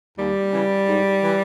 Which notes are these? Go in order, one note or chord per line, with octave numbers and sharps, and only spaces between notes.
D#2 G3
C#3 E3
G#2
E3